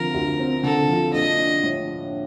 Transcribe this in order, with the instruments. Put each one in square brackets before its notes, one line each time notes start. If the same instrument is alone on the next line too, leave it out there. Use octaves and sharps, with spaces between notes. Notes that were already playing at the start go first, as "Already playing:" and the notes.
Already playing: [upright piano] D3 F3 C4 [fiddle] A#4
[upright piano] D2
C4
[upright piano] D3 [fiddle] A4
[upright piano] F3
[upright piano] A#1 [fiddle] D#5
[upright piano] D4
A2